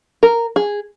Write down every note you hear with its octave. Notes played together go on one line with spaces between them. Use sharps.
A#4
G#4